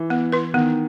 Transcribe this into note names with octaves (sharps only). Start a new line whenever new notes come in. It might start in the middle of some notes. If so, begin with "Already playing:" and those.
Already playing: E3
B3
E4 B4
D#3 B3